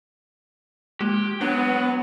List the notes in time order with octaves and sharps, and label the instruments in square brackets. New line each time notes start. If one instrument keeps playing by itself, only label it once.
[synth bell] G#3 A#3 [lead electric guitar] G4
[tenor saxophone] F#3 [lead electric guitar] B3 [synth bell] D4